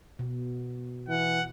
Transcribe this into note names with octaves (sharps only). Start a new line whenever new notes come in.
B2
E3 F#5